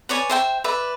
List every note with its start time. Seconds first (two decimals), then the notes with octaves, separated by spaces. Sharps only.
0.09 B4 C#5 D5 G#5
0.30 C5 E5 G5
0.64 B4 D5 E5